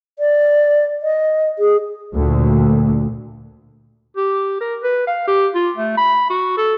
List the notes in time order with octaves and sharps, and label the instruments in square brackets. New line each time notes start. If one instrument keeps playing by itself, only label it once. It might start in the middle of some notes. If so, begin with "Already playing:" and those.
[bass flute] D5
D#5
G#4
[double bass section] D2 A#2
[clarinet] G4
A#4
B4
F5
G4
F4
A3
B5
F#4
A4